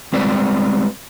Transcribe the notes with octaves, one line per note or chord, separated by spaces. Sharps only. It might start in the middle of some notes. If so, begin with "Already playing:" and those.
G3 G#3 C4 B4 D5